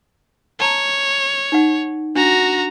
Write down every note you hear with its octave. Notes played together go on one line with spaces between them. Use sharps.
C#5 A5 A#5
D#4 F#5
D4 F#4 A#5